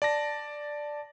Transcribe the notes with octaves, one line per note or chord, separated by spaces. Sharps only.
D5 A5 A#6